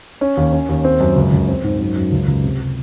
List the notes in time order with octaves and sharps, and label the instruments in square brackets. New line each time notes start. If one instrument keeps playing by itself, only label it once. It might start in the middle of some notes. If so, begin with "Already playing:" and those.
[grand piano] C#4
D#2
C#4
D#2
C4
F#2
C#2
C#2
C4
G#2
F#2
F#2
C#2
C#2
C3
C3